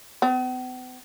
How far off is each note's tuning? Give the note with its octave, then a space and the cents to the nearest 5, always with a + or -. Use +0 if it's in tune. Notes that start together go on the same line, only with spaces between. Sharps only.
B3 +45